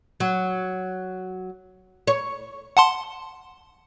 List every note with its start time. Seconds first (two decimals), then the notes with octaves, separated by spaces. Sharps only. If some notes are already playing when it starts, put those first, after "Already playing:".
0.20 F#3
2.07 C#5
2.77 F#5 A5 C6